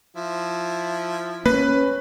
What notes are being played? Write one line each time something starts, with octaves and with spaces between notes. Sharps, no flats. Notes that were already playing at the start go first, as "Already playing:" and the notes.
F3 E4
A#3 C#4 B4